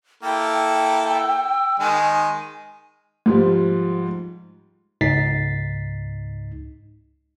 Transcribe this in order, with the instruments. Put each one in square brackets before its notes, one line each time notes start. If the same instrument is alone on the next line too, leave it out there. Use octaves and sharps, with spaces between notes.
[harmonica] A#3 E4 A4 [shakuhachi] G5
[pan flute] E6
[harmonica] D#3 G#3 [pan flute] G#5
[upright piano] G#2 F3 G3
[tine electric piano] C#2 G#2 D#4 A6 B6 C7